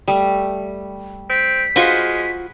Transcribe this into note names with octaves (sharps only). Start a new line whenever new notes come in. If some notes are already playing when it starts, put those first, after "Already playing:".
G3 A3
C4 B6
G#3 F4 F#4 B4 C5 C#6